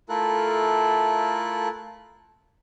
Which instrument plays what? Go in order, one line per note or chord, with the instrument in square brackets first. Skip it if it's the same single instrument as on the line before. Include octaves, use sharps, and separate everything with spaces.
[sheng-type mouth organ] A3 E4 F4 A4 A#4 F#6